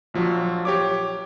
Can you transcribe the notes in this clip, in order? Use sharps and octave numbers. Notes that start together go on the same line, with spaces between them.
A#1 F3 F#3
G4 C#5 D6